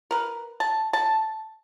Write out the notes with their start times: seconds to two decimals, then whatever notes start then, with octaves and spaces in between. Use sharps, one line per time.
0.11 A#4 B4
0.60 A5
0.93 A5